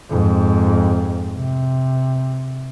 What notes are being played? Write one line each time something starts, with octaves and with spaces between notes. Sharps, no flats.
F2 G#2
C3